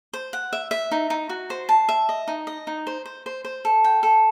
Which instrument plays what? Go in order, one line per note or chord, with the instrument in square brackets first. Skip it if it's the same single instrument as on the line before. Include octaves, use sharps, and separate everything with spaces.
[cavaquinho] C5
F#5
E5
E5
D#4
D#4
F#4
C5
A5
E5
D#5
D#4
D#5
D#4
C5
C5
C5
C5
A4
G5
A4